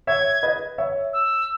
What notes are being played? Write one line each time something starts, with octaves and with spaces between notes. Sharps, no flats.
C#5 E5 G#6
B4 D#5
C#5 E5
E6